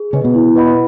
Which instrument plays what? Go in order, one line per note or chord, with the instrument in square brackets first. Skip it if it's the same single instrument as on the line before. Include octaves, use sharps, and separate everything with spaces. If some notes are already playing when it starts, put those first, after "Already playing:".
Already playing: [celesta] G#4
[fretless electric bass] C#3 C#4 [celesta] B4 D#5
[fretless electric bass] B2 B3
[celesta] E4
B4 D#5 F#5 B5